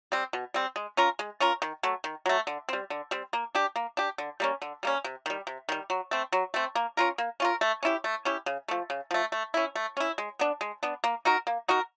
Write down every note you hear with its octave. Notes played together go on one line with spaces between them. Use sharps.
G3 C4
B2
G3 C4
G#3
C#4 F4 A#4
G#3
C#4 F4 A#4
D#3
F#3 A3
D#3
F#3 A3
D3
G3 C4
D3
G3 C4
A#3
D4 G4
A#3
D4 G4
D3
G3 A#3 C#4
D3
G3 A#3 C#4
C3
D#3 G3
C3
D#3 G3
F#3
A3 C4
F#3
A3 C4
A#3
C#4 F4 A#4
A#3
C#4 F4 A#4
A3
C#4 E4 G4
A3
C#4 E4 G4
C#3
F3 A3
C#3
F3 A3
A3
C#4 E4
A3
C#4 E4
G#3
B3 D4
G#3
B3 D4
A#3
D#4 F#4 A#4
A#3
D#4 F#4 A#4